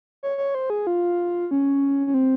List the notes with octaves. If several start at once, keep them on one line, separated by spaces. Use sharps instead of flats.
C#5
C#5
C5
G#4
F4
C#4
C#4
C4